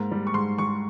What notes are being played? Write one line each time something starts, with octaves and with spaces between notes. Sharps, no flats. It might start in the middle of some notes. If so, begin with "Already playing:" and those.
Already playing: G#2 A#3
G3
C#6
G#2 C6
G3 C#6